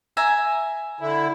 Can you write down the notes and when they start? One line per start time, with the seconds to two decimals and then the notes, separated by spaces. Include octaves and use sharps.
0.17 E5 G#5 A#5
1.01 D3 E4